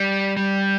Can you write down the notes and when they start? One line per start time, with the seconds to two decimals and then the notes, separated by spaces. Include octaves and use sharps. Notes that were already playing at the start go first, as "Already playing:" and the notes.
Already playing: G3
0.37 G3